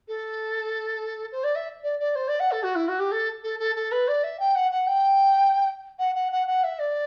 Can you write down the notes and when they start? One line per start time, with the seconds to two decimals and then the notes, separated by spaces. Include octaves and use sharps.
0.08 A4
1.32 C5
1.44 D5
1.55 E5
1.83 D5
2.00 D5
2.15 C5
2.28 D5
2.40 F#5
2.52 A4
2.63 F#4
2.75 E4
2.88 F#4
2.99 G4
3.12 A4
3.44 A4
3.59 A4
3.76 A4
3.92 B4
4.08 D5
4.24 E5
4.40 G5
4.55 F#5
4.71 F#5
4.87 G5
5.99 F#5
6.15 F#5
6.32 F#5
6.47 F#5
6.64 E5
6.79 D5